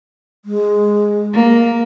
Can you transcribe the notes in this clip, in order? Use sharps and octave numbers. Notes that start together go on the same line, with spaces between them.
G#3
A#3